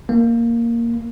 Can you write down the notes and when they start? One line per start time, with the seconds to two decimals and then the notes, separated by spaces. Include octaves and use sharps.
0.09 A#3